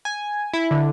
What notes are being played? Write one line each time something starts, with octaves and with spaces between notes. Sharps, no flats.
G#5
E4
D3